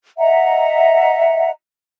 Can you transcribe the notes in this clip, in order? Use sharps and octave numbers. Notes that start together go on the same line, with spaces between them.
D#5 E5 F#5 A#5